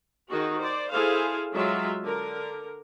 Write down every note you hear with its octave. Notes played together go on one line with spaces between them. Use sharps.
D#3 D#4 F#4 G#4
C5 D5
E4 G#4 A4 C5 F5
F#3 G#3 F4 E5
D3 A#4